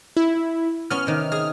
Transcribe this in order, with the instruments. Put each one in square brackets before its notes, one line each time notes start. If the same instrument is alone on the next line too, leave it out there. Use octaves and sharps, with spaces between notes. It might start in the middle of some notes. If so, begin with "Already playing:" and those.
[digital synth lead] E4
[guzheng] B3 C#4 [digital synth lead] F6
[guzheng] C3 D#3
[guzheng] G#4 [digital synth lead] F6